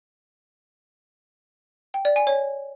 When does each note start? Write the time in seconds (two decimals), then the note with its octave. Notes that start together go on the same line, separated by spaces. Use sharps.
1.94 G5
2.05 D5
2.16 G#5
2.27 C#5